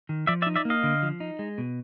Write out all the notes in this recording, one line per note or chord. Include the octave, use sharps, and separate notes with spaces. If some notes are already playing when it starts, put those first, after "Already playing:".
D#3
F3 D5 E5
D5 E5
D#4
D5 E5
A#3 D#5 F5
D3
F3
D#4
G#3
B2